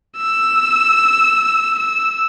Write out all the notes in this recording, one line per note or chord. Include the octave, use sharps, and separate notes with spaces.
E6
E6